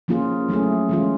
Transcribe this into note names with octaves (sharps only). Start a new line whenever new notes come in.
F3 A#3 C#4 F4 G#4
F#3 A3 C#4 E4 G#4
E3 G#3 C#4 F4